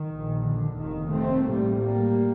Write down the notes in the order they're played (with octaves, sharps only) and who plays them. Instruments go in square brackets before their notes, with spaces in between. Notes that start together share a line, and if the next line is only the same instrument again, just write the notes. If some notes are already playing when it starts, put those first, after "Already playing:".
Already playing: [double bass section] D#3
A#1 A#2
D3
F1 D#2 D#3
A3 C4
A1 A2 G3 A#3
G3 A#3